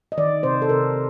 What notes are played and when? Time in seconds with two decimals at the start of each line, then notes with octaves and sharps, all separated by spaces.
0.12 D#5
0.17 D#3 D5
0.43 C3 C5
0.62 A4
0.69 C3 A#4